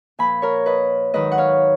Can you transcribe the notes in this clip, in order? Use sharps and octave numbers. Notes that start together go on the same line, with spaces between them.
A#2 F3 G#5 B5
A#4 C#5
B4 D#5
G#2 D#3 F#3 B4 D#5
F#5
C#5 F5